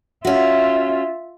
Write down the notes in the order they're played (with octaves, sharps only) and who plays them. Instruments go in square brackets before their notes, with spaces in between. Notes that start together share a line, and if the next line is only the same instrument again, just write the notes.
[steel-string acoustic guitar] C#4 F#4 [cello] F4 E5